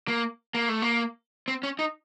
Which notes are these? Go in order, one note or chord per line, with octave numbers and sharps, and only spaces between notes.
A#3
A#3
A3
A#3
C4
C#4
D#4